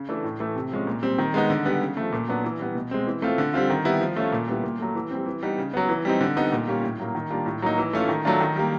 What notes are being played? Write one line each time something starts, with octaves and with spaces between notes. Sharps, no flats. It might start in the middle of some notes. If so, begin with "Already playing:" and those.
Already playing: C#3
E3 A3 D4
A2
E3 A3
C3
F3 G#3 C#4
A#2
G3 C4
D#3
G#3 B3 D#4
D3
G3 B3
C#3
F3 A3
A#2
F#3 B3 D4
E3
G3 B3
B2
G#3 C4
E3
A3 C4 F4
D3
G3 C4 F4
D#3
G3 B3 E4
F3
A3 C#4 F4
A#2
G3 B3 E4
A#2
F#3 A3
E3
G3 C4
E3
G3 B3 D#4
C#3
F#3 B3
E3
G3 C4 D#4
D3
G3 B3 D#4
A#2
G3 A#3 C#4 F4
A2
F#3 A#3
D#3
G3 A#3 D4 F4
A2
F#3 A#3 D#4
E3
A3 C#4 F4
D#3
F#3 A3 D4 F4
D#3
G3 A#3